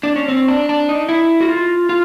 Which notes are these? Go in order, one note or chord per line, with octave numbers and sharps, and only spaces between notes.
D4
C#4
C4
D4
D4
D#4
E4
F#4
F4
F4